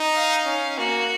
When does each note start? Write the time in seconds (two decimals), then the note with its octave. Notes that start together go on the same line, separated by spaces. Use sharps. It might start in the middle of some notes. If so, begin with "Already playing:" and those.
Already playing: D#4
0.14 F5
0.46 C#4
0.78 A#3 F#4